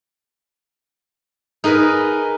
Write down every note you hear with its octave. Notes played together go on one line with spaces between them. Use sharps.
D#4 G#4 A#4 B4 D#5